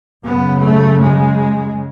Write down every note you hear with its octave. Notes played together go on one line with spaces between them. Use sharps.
F#2 C#3 B3
A3
G#3